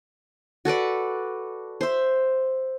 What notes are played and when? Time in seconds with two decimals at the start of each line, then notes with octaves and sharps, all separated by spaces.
0.65 F#4 A4 B4 D5
1.81 C5 E5